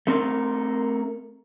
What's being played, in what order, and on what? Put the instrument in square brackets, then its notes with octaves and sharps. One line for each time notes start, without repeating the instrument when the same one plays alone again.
[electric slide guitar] A3 C4 A#4